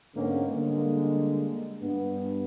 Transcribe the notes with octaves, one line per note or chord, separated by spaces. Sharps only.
G#2 D3 A#3 B3 C#4 D#4
D3 G3 G#3 A#3
G2 B3